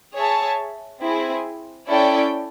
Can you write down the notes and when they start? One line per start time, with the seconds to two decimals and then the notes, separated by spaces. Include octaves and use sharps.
0.14 G#4 C#5 E5 A5
1.01 C4 E4 G#4
1.88 C#4 E4 A4 D5 G5